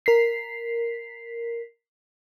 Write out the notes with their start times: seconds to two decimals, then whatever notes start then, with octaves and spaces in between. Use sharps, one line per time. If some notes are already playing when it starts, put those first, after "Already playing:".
0.06 A#4 B6 C7